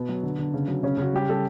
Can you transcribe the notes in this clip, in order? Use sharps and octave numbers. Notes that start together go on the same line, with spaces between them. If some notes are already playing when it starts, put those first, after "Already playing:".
Already playing: B2 B3
F#3
D3
D3
C#3
F#3
C#3 C#4
C#3 F#4
G3 G4
G3 A4